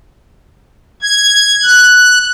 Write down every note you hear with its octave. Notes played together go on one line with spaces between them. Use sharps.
G#6
F#6